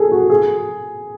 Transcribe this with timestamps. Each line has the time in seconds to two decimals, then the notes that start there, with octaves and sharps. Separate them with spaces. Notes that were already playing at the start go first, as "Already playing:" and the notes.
Already playing: G#4 A4
0.12 F#4
0.30 G#4